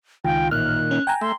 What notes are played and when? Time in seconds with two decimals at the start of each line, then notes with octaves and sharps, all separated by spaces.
0.25 C#2 D#3 F4 G5
0.51 A1 A#2 D#3 F6 F#6
0.91 C#4
1.07 G5 G#5 A#5
1.21 A3 E5 C6